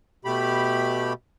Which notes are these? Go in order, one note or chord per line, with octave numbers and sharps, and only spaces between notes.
B2 A3 G4 B5